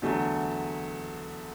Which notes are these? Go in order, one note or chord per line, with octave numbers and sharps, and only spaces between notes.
E2 D3 F#3 A3